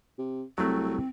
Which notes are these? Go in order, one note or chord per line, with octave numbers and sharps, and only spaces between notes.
C3
C2 F#3 A3 C4